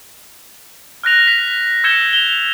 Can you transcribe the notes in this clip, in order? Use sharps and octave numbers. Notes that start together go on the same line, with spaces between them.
F6 F#6 A#6 F7
B6 F7
E6 G6 G#6 C#7 E7 G7
F7 G7